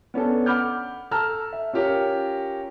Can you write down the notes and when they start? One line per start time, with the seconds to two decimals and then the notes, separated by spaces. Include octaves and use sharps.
0.14 B3 C#4 D4 A4
0.46 F#5 B5 D6 F6 G6
1.11 A4 A5 A#5 E6 F6
1.53 E5
1.73 C#4 F4 G4 A#4 C#5